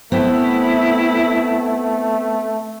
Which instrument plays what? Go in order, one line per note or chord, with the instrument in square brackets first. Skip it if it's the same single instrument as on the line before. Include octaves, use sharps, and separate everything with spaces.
[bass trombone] A3 [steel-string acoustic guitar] B3 C4 [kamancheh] E4